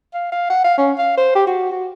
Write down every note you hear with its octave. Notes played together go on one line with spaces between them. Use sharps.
F5
F5
F#5
F5
C#4
F5
C5
G4
F#4
F#4